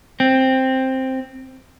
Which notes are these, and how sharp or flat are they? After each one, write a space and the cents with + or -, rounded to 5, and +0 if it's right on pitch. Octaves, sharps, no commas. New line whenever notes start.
C4 +5